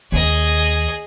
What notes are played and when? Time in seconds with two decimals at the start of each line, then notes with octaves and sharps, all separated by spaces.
0.12 D#2 G#4 D#5